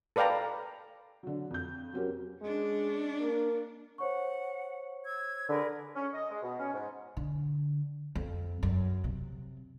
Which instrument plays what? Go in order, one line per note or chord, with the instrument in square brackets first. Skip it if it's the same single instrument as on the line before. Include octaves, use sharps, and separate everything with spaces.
[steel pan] A4 B4 D5 F5 G5 A#5
[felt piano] D3 F#3
F2 G6
F#3 C4 C#4 F#4 G4 A#4
[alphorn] G#3 [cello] C#4 D4
[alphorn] A#3
[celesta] C5 C#5 C#6 [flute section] F#5
[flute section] E6 G#6
[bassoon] D3 [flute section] G#4 A#4 B4
[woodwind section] C#4
D#5
G#3
B2
C#4
G#2
[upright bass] D3
F2
F#2
C3